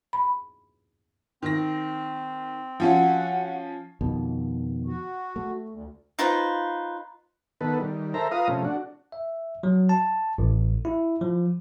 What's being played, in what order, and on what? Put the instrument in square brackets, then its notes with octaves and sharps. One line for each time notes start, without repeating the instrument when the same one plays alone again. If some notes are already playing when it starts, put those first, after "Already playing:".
[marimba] B5
[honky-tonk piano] D#3 A#6 [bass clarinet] C4
[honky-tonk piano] F3 C#4 F4 [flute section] F#4 F#5
[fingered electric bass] F2 B2 D#3
[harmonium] F#4
[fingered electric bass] A3
[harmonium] D2
[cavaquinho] D#4 F4 B4 C5
[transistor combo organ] D#3 B3 A4 B4
D#3 G3
A4 A#4 C5 E5 A#5
F4 B4 F5 A#5 D#6
C3 F3 A3 C#4
D4 F#4
[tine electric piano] E5
F#3
A5
A1
E4
F3